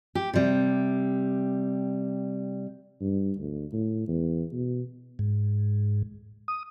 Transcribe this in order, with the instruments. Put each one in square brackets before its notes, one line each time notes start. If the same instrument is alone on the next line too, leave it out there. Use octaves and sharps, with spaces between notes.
[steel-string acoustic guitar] G4
C3 G3
[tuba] G2
D2
A2
E2
B2
[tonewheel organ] G#2
D#6